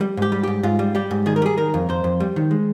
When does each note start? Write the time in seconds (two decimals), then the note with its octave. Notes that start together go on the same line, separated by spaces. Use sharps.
0.01 G3
0.17 G#2 G4
0.32 G3
0.43 G#2 G4
0.63 G#2 F4
0.79 G3
0.95 G3 G4
1.11 G#2
1.26 D#3 G#4
1.36 A#4
1.42 G3 G#4
1.58 D#3 A#4
1.74 F2
1.89 F2 C5
2.04 F2
2.20 G3
2.36 D#3
2.51 G#3